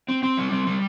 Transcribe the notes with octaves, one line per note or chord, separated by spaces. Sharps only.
C4
C4
G3
C4
G3